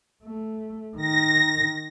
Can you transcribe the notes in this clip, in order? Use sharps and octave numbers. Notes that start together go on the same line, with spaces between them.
A3
D#3 A#6